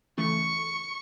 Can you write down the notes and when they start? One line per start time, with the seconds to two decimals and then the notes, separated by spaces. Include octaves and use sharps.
0.18 C#3 E3 A3 C#6 C#7